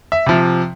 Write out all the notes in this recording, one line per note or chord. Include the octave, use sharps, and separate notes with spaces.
E5
C3 F3